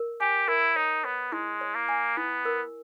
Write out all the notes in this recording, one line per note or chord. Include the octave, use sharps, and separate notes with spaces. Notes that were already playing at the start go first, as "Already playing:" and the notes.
Already playing: A#4
G4 G#5
E4 A#4
D#4 C#5
B3 C#5
G#3 E4
C#5
A#3
G#5
B3 E4
A#4